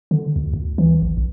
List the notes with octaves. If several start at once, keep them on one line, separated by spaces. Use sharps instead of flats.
D3
D2
D2
E3
G#1
A#1